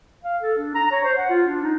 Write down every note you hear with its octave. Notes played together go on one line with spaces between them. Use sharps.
F5
A4
D4
A#5
C#5
C5
F#5
F4
D4
D#4